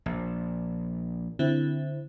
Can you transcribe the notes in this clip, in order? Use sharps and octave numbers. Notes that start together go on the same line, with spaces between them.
A#1
D3 C4 E4